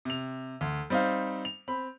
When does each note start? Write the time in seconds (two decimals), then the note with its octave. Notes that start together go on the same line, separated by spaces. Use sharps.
0.05 C3 F7
0.61 D2
0.90 G3 C4 D#4 C5 F5
1.45 F7
1.68 C4 B5